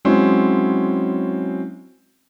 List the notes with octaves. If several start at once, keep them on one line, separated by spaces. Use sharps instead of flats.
F#3 G#3 C4 C#4 E4